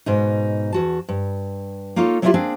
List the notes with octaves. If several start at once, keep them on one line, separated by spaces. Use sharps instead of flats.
G#2 B2 D#4
E2 F#4 A5
G2
A#3 D#4 F4 A4 C#5
F#3 A#3 D4 E4 F4 G4
A#3 C4 D4 G#4